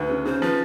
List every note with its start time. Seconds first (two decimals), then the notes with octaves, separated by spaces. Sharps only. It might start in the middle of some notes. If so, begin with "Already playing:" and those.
Already playing: D2 B4
0.10 C#3
0.25 C#3 C5
0.42 F3 B4